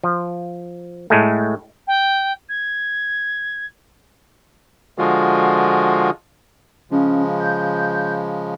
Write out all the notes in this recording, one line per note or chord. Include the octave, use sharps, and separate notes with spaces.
F3
A2 G#3 A3
G5
G#6
D3 F3 G#3 F4 F#4
C#3 F3 G#3 C#4
G6